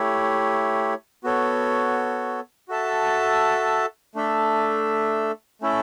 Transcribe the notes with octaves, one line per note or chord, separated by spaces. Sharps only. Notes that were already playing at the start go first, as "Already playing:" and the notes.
Already playing: A3 E4 G4 C#5
B3 F#4 A4 C#5
F#4 A4 E5 A5
A3 D4 A4 E5
A3 C#4 E4 A4 E5